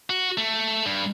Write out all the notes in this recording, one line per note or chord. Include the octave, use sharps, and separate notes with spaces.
F#4
A3
G2